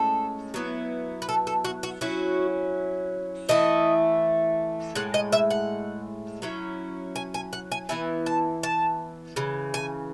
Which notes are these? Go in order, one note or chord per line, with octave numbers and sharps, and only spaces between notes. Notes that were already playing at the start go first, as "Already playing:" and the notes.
Already playing: A2 G#3 C#4 A4
F#3 B3 E4
B4
A4
A4
F#4
F#4
F#3 C#4 E4 F#4
E3 A3 E4 D#5
A2 G#3 F#5
D#5
E5
F#5
F#3 C#4 E4
G#5
G#5
F#5
G#5
E3 B3 E4 G#5
A5
A5
C#3 E3
G#5